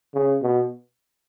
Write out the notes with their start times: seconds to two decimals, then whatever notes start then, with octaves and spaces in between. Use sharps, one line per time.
0.14 C#3
0.42 B2